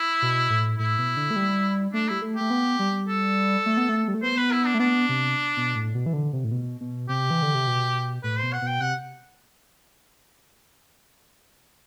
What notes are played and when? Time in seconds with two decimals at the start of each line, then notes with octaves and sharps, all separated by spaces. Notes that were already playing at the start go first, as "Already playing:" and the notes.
Already playing: E4
0.22 B2
0.50 A2
0.79 A2 E4
0.99 B2
1.17 D3
1.31 A3
1.36 G3
1.94 A3 D4
2.08 G3 E4
2.22 A3
2.36 A3 G4
2.50 B3
2.79 G3
3.08 A4
3.66 A3
3.77 B3
3.89 A3
4.08 G3
4.14 A3
4.23 B3 C5
4.37 B4
4.52 E4
4.66 D4
4.74 A3
4.80 B3 D4
5.09 C3
5.57 B2
5.75 A2
5.95 B2
6.06 E3
6.13 D3
6.33 C3
6.44 A2
6.52 B2
6.81 B2
7.09 C3 G4
7.31 E3
7.42 D3
7.55 C3
7.67 B2
8.23 A2 B4
8.38 B2 C5
8.53 F#5
8.62 B2 G5
8.80 C3 F#5